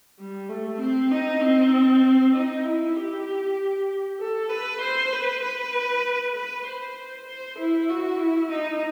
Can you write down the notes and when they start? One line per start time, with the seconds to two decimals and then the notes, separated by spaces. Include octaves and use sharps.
0.19 G3
0.49 A3
0.80 C4
1.11 D#4
1.42 C4
2.34 D#4
2.64 E4
2.96 G4
4.19 A4
4.50 B4
4.81 C5
5.12 B4
5.42 B4
6.35 B4
6.66 C5
7.27 C5
7.58 E4
7.90 F#4
8.19 E4
8.51 D#4